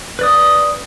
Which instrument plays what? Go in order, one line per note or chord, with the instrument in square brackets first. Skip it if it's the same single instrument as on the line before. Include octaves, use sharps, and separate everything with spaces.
[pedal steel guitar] B4 D5 D#6